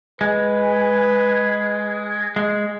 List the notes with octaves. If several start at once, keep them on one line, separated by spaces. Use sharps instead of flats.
G#3 B4
G#3